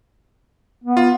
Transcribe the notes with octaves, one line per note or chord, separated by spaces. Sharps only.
B3
F4